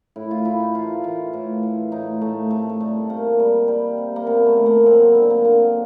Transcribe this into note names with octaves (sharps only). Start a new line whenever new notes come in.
A2 E4
F4
A3 E4
D#4
E3 F4
E3
A2
E3
A2 D#4
A2 A3
C3 A3
A3
G3 A3
C3 A#3
G3
G3
C3
A#3
C3 B3
A3
D#3
A#3
F#3 C4
B3
D3 C4
A#3
D3 A#3